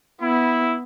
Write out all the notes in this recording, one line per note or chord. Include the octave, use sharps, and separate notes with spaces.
B3 E4